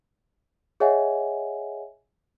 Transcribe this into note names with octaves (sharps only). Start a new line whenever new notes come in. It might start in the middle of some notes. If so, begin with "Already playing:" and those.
G#4 C#5 D#5 E5 F#5 G#5